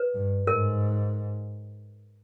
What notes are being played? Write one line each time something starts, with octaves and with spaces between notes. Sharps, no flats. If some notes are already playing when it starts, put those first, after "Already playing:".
Already playing: B4
G2
G#2 A#4